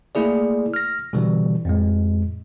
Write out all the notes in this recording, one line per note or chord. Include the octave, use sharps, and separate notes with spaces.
A3 A#3 E4 G#4 D5
F6 A#6
B2 D3 E3 G3
F2 A2 G#3